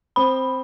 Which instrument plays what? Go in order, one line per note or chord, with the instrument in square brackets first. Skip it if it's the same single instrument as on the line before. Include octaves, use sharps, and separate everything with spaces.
[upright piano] C4 [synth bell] B5